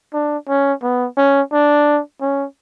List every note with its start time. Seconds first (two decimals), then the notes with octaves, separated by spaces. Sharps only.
0.14 D4
0.49 C#4
0.83 B3
1.17 C#4
1.53 D4
2.21 C#4